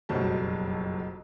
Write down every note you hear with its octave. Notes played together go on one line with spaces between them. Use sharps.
F#1 B1 F2 F#3 G3 A5